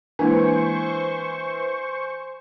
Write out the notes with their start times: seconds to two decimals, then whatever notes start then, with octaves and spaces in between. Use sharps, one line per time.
0.19 E3 G#3 A#3 D4 C5 G#5 C#6